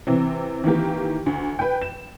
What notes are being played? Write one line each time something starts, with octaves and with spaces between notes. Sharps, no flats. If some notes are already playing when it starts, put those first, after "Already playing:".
C3 E3 C4
D#3 E3 A#3 G4
D2
B4 G5
E7